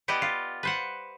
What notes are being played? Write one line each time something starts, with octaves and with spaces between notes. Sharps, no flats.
B3 E4 G4 D5 D#5
F4
B4 C5 F#5